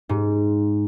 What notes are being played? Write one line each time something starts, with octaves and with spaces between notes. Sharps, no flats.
G#2